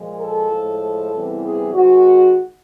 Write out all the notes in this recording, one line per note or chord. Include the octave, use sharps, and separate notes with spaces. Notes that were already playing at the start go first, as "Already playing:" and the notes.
Already playing: A#2 F3 G#3
A4
A2 F3 G#3
E2 C3 E3 G3
G#4
G#2 D#3 G#3 F#4